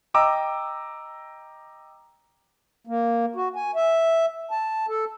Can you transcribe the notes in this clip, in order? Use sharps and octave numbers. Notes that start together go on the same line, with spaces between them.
D#5 G5 A#5 D6 E6
A#3
F#4
G#5
E5
A5
A4